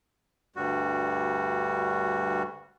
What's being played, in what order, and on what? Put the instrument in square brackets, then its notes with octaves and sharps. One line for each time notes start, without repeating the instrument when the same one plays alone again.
[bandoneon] D2 G2 G3 F#4